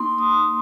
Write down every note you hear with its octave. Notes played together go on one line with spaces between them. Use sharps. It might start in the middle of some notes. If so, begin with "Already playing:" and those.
Already playing: A#3 D#4 C6
D#6